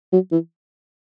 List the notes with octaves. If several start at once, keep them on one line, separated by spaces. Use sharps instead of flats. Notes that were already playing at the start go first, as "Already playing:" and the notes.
F#3
E3